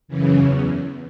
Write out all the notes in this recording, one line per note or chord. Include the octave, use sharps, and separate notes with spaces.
F#2 C#3 E3
E2 C#4